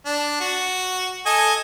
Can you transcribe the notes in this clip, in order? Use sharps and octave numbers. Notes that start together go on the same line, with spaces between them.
D4
F#4
A4 D#5 G#5